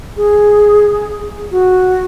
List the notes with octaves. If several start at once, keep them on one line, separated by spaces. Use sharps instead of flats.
G#4
F#4